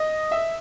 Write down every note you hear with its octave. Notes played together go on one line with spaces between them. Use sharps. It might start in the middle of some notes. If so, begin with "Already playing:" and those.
Already playing: D#5
E5